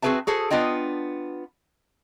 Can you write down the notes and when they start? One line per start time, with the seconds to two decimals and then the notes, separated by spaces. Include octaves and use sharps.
0.02 C4 F#4 G#4 B4 E5 A5
0.27 F#4 G#4 A4 C5
0.50 B3 D4 F4 D#5 G5